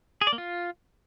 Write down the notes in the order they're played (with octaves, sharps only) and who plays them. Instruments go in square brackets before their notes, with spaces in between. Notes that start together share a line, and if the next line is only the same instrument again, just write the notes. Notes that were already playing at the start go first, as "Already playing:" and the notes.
[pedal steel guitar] G#4
D5
A#3
F4